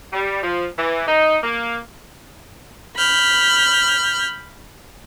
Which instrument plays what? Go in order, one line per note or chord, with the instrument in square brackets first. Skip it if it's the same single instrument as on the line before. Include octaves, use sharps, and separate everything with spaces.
[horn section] G3
F3
E3
D#4
A#3
[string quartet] B5 F6 G6